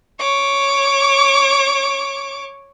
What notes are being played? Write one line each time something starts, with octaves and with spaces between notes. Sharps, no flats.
C#5 D6